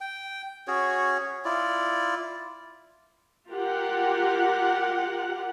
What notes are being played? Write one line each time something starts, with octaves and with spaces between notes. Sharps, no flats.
G5
C#4 F#4 G#4 C#5
E4 F4 D5
F4 G4 A#4 F#5